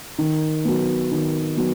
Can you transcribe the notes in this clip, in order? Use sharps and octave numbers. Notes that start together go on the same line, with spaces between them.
D#3
F#3 B3
D#3
F#3 B3